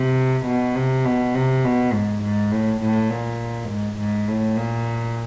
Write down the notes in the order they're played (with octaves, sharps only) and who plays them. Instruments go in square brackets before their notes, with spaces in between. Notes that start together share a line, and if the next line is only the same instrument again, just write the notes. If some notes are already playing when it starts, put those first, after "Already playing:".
Already playing: [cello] C3
B2
C3
B2
C3
B2
G#2
G#2
A2
A2
A#2
G#2
G#2
A2
A#2